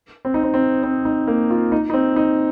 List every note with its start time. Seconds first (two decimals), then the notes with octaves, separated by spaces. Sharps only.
0.25 C4
0.34 D#4
0.44 C4
0.54 C4
0.83 C4
1.05 D#4
1.27 A#3
1.50 F4
1.72 D#4
1.90 D#4
1.94 C4
2.16 D#4